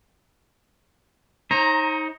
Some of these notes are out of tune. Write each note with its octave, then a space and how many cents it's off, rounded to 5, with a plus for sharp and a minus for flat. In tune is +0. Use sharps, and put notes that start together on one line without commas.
D#4 +20 C5 +45 A#5 +0